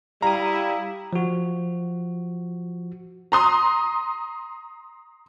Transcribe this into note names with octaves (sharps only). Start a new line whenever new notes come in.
G3 E4 F5 A#5 D#6
F3 F#4
A#5 C6 D#6